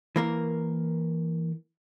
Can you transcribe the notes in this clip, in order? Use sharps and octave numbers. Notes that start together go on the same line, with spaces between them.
E3 A#3 A#4